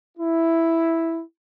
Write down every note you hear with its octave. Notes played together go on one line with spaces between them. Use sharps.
E4